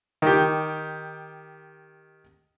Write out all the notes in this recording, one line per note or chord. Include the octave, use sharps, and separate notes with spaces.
D#3 G4